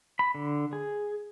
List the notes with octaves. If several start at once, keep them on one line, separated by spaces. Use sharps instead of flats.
B5
D3
G#4